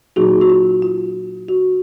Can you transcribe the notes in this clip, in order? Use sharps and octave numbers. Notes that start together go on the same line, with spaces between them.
A#2 F#3 A#3 D#4 F#4 G#4
F#4
F4
F4
F#4